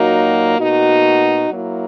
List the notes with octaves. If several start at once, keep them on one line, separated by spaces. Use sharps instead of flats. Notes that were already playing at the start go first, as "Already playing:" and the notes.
Already playing: A#2 F#3 A#3 D#4 F#4
B2 A#3 D#4 F#4
F#3 A#3 E4